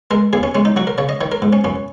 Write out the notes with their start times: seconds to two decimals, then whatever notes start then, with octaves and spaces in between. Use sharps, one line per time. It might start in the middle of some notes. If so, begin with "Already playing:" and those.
0.11 G#3 A#4
0.33 D#2 G#4
0.43 C#4
0.55 G#3 C#4
0.65 D#4
0.76 F#3 F#4
0.87 A#4
0.98 C#3 C#5
1.09 D#5
1.21 D#3 C#5
1.32 A#4
1.42 G#2
1.53 C#4
1.64 F#2 C#4